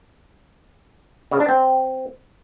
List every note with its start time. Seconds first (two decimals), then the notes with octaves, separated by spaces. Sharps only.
1.31 C#3
1.40 D4
1.49 C4